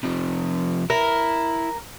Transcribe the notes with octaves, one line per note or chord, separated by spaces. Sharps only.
C3 F3
E4 A#4